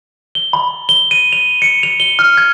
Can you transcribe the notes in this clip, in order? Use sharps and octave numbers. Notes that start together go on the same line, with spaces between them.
G7
B5
G7
D#7
F7
C#7
F7
G7
F6
G#6